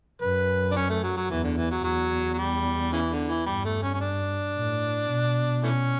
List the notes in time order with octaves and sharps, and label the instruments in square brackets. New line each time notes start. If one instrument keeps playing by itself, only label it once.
[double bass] F#2 [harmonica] B4
[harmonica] D4
C#4
A3
F#3
F#3
[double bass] E2 [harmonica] E3
[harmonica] D3
E3
F#3
[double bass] E2 [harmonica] F#3
[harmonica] F#3
G3
C#3 E3
D3
E3
[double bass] G2 [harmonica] G3
[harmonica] A3
C#4
C#4
D4
[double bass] A2
B2
[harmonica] E3 A3 C#4